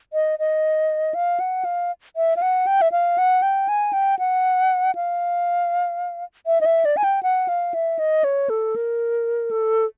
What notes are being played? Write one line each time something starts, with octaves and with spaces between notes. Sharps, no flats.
D#5
D#5
F5
F#5
F5
E5
F5
F#5
G5
E5
F5
F#5
G5
G#5
G5
F#5
F5
E5
D#5
E5
D5
G#5
G5
F#5
F5
E5
D#5
C#5
A4
A#4
A4